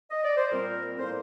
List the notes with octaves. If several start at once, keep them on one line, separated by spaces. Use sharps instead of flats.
D#5
D5
C5
A#2 G3 C4 A#4
A2 G3 A#3 C5